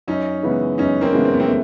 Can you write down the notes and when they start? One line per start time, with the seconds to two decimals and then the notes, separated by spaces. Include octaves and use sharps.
0.08 F#2 C#4 D#4
0.43 C#3 E3 G#3 B3
0.78 F#2 C#4 D#4
1.01 A#3 C4
1.13 C#3 E3 G#3 B3
1.25 C4
1.33 B3
1.40 A#3 C4
1.48 A3